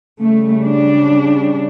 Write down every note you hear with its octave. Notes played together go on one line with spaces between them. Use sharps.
C#3 G3 A3
D4